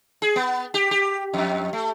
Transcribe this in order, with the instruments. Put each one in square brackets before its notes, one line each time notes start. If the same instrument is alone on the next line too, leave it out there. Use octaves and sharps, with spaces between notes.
[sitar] G#4
B3
G4
G4
F2
A3